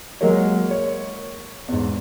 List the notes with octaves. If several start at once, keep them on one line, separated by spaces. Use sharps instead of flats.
F#3 G#3 A#3 A#4 C#5
C#5
E2 G#2